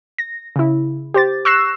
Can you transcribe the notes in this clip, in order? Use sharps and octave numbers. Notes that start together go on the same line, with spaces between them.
A#6
C#3 E4
G4 C5 A6
C#6 E6 F#6 A#6 C7 E7